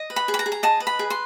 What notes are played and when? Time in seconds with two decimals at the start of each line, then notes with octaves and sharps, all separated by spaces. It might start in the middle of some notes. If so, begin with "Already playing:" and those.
Already playing: D#5
0.10 B4
0.16 B5
0.28 G#4
0.34 B5
0.39 A#5
0.46 G#4
0.52 A#5
0.63 D#5 A5
0.80 B4
0.87 B5
0.99 G#4
1.10 C6